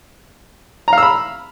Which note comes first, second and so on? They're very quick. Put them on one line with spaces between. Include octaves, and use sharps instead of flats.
A#5 F5 E6 B5